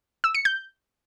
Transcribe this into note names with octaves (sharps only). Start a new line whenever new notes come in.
E6
C#7
G6